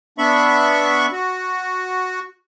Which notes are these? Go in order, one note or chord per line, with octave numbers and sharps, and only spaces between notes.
B3 D4 E5 B5 C#6
F#4